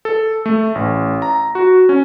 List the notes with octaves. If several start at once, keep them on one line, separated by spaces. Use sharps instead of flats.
A4
A3
A1
A#5
F#4
C#4